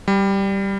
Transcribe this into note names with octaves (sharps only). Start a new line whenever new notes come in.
G3